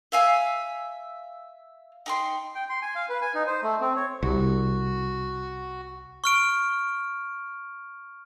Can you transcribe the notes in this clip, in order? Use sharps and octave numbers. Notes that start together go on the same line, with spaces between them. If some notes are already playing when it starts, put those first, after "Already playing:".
E5 F5 G#5
D#4 G5 C6
G5
C6
G#5
F5
B4
G#5
D#4
C5
A3
C4
C#5
C2 F#4
C#6 F6 D7